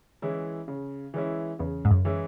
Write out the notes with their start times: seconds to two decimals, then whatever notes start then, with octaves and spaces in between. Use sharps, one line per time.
0.22 E3 G#3 C#4 E4
0.68 C#3
1.14 E3 G#3 C#4 E4
1.59 E2 C#3
1.85 G#2
1.91 F#2
2.05 E3 G#3 C#4 E4